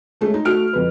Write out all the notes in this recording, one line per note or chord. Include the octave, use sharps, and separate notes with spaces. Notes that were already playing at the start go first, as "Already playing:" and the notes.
G#3 A3 C#4
D#4
A3 F#4 F6 D7
F2 B4